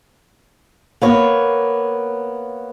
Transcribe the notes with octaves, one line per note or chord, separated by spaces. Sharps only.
A#3 B3 C#5